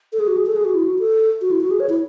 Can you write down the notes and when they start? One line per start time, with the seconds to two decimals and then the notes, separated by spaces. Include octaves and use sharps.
0.13 A4
0.20 G#4
0.27 F#4
0.37 G#4
0.46 A4
0.56 G#4
0.65 F#4
0.75 E4
0.84 F#4
0.99 A4
1.41 F#4
1.51 E4
1.60 F#4
1.71 G#4
1.80 C#5
1.89 E4